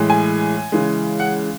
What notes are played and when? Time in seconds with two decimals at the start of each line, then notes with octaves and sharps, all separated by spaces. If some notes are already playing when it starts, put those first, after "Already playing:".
Already playing: A2 E3 G#3
0.10 G#5
0.72 C#3 E3 G#3
1.20 F#5